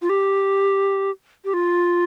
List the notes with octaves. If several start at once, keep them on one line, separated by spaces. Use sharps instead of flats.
F4
G4
G4
F4